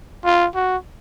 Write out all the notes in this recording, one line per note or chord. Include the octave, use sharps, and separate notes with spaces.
F4
F#4